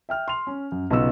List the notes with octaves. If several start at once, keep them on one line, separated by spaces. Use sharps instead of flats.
E5 G5 F6
C6 F7
C#4
F#2
B1 C#3 B3 F4 E6 E7